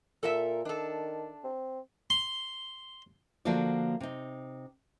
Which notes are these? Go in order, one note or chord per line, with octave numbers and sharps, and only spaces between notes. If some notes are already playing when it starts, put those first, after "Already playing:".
A#2 A4 A#4 E5
D#3 D4 A4
C4
C6
D3 F3 A#3 D4 F#4 D5
C3 D#4